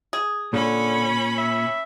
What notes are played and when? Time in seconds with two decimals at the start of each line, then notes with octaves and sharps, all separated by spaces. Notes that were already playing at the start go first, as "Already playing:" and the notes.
0.13 G#4
0.53 A#2 D3 C#4 B5
1.38 E5